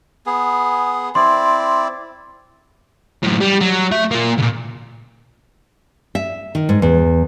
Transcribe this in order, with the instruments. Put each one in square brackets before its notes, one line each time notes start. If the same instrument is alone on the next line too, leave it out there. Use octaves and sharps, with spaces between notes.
[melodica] B3 G#4
[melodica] C4 E4 D5 [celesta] C6
[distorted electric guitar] F#2 A2
G3
F#3
A3 E5
A#3 F4
C#2 A#2
[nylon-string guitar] E5
D#3
G#2
E2